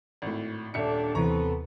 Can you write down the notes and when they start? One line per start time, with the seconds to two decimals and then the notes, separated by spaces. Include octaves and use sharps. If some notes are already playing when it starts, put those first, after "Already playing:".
0.22 G#1 A2
0.74 D#1 D4 A4 E5 C#7
1.15 D#2 C3 E3 B3 C4 A4 A#5 C#6